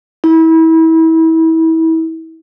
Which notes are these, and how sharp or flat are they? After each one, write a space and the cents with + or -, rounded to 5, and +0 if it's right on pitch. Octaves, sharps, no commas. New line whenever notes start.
E4 -30